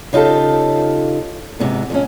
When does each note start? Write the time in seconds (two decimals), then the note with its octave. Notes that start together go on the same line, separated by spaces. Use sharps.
0.13 C#3 D#4 F4 G4 A4
1.59 G#2 C3 B3
1.90 F2 G#2 C#4